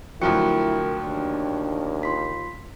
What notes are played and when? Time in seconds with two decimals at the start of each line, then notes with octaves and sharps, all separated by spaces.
0.21 D2 F3 F#3 E4 A#4 G5 C#6 C#7
1.03 D#2 D4
2.03 F4 C6 B6